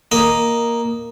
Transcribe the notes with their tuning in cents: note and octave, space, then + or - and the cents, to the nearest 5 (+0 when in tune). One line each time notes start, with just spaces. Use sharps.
A#3 +5 D#5 +0